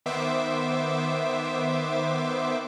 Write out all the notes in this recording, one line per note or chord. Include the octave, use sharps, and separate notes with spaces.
D#3 B3 C5 E5 D6